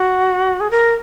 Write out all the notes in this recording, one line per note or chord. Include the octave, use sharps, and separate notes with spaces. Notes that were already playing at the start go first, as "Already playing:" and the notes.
Already playing: F#4
G#4
A#4